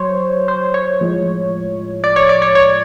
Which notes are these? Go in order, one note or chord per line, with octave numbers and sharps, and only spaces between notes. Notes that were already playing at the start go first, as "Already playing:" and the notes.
Already playing: F#3 C5 C#5
C5
C#5
A2 F3 G#3
D5
C#5
D5
C#5
C#5